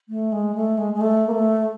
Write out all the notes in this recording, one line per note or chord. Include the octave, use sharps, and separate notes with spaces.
A3
G#3
A3
G#3
G#3
A3
A#3
A3